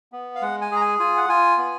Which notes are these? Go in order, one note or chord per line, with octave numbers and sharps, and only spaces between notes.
B3
F5
G#3 F#5
G#5
G#4 A#5
G#5
F4 G#5
F#5
F4 G#5
B3